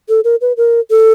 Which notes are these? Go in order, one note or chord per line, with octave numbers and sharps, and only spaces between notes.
A4
A#4
B4
A#4
A4